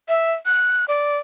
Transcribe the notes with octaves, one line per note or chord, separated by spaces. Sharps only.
E5
F#6
D5